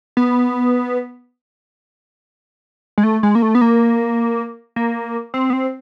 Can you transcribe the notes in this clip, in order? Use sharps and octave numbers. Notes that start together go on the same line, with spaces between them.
B3
G#3
A3
G#3
A#3
A3
B3
A#3
A#3
C4
B3
C4